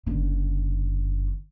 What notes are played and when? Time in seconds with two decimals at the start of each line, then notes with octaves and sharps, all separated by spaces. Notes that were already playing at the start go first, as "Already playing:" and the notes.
0.07 F#1 D3